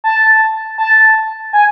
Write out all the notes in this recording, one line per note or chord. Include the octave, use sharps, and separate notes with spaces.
A5
A5
G#5